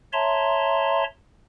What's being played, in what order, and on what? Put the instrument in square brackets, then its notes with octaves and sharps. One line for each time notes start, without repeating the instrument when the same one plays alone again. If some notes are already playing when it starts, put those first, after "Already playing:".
[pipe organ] C#5 E5 A5 A#5 C6